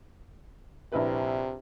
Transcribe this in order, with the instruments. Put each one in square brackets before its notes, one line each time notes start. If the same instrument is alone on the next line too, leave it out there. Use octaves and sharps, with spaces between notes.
[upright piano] A#1 E4 B4 [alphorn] C3